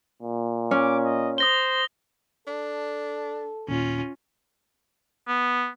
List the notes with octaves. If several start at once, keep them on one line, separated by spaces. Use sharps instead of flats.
A#2
C#4 D6
D#5
C5 D#6 A#6 G7
D4 A4
D#2 A#2 C#4 F4
B3